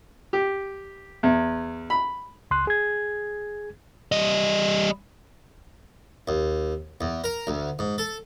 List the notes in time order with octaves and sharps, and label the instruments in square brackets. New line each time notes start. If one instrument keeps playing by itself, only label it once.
[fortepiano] G4
E2
B5
[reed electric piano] C#2 C6 F#6
G#4 G#6
[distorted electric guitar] G3 D#5
[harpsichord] D#2
E2
A#4
D2
G#2
A4